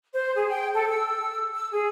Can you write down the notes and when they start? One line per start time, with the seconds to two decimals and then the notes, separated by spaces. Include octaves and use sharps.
0.13 C5
0.35 G#4
0.49 G5
0.73 A4
0.90 E6
1.54 E6
1.72 G#4